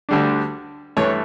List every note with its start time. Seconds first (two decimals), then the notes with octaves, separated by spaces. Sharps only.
0.09 D2 D3 G3 D4
0.97 G2 E3 A3 C#5